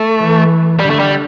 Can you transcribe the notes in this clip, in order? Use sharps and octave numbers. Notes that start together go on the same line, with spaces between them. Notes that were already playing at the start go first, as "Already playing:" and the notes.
Already playing: A3
E3
D3 G3
A3
G3